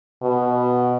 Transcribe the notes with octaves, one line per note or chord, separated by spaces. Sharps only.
B2